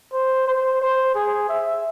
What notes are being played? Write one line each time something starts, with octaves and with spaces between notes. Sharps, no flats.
C5
C5
C5
G#4
E5